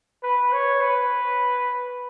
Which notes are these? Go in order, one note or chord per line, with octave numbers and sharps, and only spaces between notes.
B4
C#5
B4